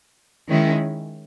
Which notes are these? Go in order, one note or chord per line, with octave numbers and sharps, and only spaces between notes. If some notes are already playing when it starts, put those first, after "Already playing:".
D#3 G#3 C#4 E4